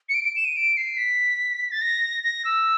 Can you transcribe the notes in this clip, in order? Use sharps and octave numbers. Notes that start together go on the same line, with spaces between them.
C#7
D7
D7
E7
D#7
D7
C7
B6
A6
A#6
A#6
E6